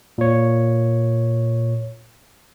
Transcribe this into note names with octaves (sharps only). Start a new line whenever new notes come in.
A#2 C#5